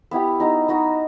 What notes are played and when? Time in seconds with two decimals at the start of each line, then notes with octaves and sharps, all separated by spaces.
0.11 B3 E4 G4
0.40 B3 D#4 F#4
0.68 B3 D#4 F#4